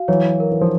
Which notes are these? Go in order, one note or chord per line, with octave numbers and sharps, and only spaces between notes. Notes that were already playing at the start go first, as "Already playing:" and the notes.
Already playing: F#4 F5
E3 F#3 C#5
A#4
E3
F3